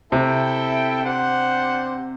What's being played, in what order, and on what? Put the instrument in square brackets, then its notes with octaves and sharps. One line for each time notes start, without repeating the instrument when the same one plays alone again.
[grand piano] C3 [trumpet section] E4 A4 E5 G5
[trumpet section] D4 G4 C5 F#5